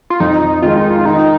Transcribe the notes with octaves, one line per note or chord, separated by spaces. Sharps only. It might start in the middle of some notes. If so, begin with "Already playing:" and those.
F4
F2 D#4
D#3 G#3 F4
D#4
F4
D#3 D#4